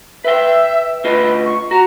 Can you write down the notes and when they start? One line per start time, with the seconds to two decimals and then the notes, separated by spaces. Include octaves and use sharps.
0.24 B4 E5 G5
1.04 D2 F4 B4 D#5
1.46 C#6
1.71 F#4 A#5